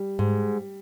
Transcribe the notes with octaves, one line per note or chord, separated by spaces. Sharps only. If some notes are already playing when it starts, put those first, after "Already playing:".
Already playing: G3
G#2